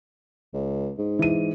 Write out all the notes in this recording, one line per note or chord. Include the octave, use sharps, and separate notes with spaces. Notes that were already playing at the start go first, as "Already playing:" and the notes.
C#2
G#2
E3 D#7